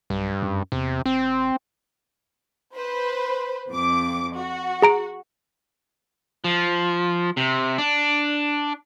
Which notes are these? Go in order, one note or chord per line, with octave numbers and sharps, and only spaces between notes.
B1 G2
F#2
E2 C3
E1 C4
B4 C5
F2 D6
F#4
G#4 A#5 D7
F3
C3
D4